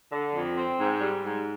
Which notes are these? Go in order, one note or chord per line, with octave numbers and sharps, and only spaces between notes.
D3
F2
C4
G#2
G3
G#2